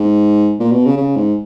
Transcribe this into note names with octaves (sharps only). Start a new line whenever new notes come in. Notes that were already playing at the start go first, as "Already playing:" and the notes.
Already playing: G#2
A#2
B2
C#3
C#3
G#2